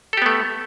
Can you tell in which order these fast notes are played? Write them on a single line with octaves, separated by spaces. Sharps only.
A4 G4 B3 A3